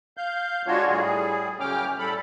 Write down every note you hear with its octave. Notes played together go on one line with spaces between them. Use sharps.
F5 G6
D3 G#3 D4 F4 F#4 C#5
A2 G3 G#4
F#2 C#3 C#4 G5 D6 F6
A2 G3 A4 B5